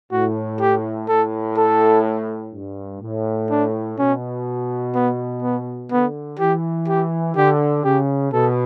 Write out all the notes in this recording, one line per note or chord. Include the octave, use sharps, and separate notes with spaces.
A2 F#4
G4
A2 A4
A4
G2
A2
D4
B2 C#4
B3
B3
D3 B3
E3 G4
G4
D3 G4
C#3 G4
B2 A4